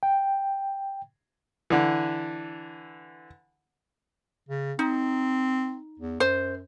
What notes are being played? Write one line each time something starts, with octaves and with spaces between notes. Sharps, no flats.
G5
D3 E3
C#3
C4 D#4
E2
F#2 C5